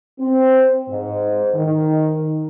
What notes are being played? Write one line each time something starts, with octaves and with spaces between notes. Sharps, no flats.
C4
G#2
D#3